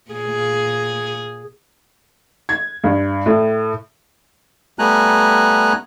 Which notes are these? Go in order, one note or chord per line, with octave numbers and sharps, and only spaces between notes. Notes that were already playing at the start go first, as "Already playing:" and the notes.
A#2 G#4
G#6
G2
A2
G3 A3 B3 G#5 A#5 F#6